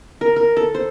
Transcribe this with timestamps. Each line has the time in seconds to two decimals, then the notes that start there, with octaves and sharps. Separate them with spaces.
0.21 A#4
0.36 A#4
0.57 A4
0.74 C5